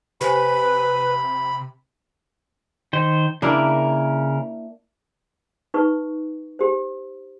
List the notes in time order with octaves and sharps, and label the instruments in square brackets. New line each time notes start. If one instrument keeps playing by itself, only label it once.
[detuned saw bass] C3 [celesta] G4 C5 G#5 [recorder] B4 [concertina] B5
[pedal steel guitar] D#3 C5
[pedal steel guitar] C#3 A#4 [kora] A#3 D4 E4
[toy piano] D#4 B4 C#6
G4 C5